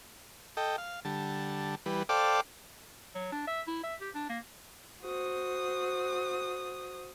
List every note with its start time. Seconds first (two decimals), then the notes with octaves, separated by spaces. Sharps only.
0.57 A4 D#5 G5
0.78 F5
1.05 D3 G3 A5
1.86 E3 G3 B4
2.09 A4 C5 D5 F5 G5 D6
3.15 F#3
3.32 D4
3.48 E5
3.68 E4
3.83 E5
4.01 G4
4.15 D4
4.29 A#3
5.02 F#4 C5 D#6